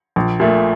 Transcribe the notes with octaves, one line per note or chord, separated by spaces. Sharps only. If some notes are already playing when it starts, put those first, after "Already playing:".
A#1
A#2 A3